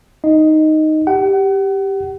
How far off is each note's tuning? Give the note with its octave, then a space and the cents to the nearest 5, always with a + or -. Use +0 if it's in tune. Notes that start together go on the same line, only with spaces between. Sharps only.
D#4 +0 D#5 +0
G4 +0 F#5 +40